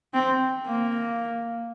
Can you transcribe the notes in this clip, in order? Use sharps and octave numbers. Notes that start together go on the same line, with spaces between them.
C4
A#3